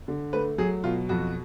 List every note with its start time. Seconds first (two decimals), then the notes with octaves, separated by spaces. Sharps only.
0.08 D3
0.33 A3 B4
0.58 F#3 G#4
0.84 B2 F4
1.09 F2 F#4